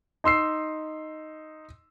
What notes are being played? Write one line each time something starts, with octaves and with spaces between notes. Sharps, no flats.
D#4 C6 E6 C7